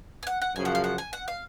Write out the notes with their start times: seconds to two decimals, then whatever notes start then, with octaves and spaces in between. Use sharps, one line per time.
0.23 G#5
0.27 F#5
0.42 F#5
0.56 F#2 C#3 F3 G#5
0.65 F#5
0.75 F5
0.84 F#5
0.98 G#5
1.13 F#5
1.28 F5